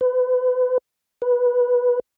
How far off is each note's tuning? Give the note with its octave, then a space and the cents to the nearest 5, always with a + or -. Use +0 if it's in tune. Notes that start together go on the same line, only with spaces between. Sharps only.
B4 +35
B4 -10